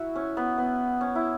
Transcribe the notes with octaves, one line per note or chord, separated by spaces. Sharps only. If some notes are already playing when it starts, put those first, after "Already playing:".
Already playing: E4 F#4
C#4
B3
B3
C#4
E4